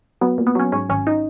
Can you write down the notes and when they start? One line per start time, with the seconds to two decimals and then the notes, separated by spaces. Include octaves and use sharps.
0.21 F#3 B3
0.38 A#2
0.47 B3
0.55 F#3 C#4
0.72 G#2 C#4
0.89 G#1 C#4
1.07 D#4